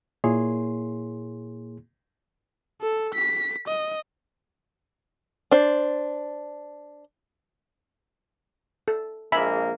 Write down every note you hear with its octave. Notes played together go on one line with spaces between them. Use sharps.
A#2 A#3 E4 G#4 C#5 C6
A4
B6
D#5
D4 C5
A4
A#1 G#3 A#3 E5 G#5 B5